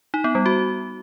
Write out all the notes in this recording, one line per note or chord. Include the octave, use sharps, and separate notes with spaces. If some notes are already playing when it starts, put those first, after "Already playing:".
D#4
B3
G3
F#4